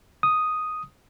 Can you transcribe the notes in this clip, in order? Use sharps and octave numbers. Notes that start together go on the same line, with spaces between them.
D#6